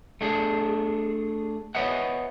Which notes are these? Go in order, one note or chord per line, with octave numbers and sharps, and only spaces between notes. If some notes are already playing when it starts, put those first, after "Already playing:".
A3 D4 G#4
B4 C#5 D#5 E5 F#5